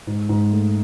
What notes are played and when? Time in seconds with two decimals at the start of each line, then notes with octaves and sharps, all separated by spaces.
0.07 G#2
0.29 G#2
0.52 A3